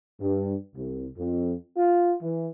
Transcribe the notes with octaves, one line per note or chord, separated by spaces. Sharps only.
G2
C2
F2
F4
E3